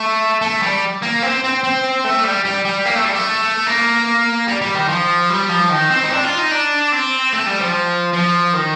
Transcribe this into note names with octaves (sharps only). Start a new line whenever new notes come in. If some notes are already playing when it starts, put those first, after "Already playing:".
Already playing: A3
A3
G3
A#3
C4
C4
C4
A3
G3
G3
G3
A#3
A3
G3
A3
A#3
G3
G3
D#3
F3
G3
F3
D#3
C4
D#4
D4
F4
D#4
D4
C4
A3
G3
F3
F3
D#3